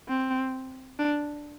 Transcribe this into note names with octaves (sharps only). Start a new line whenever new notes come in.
C4
D4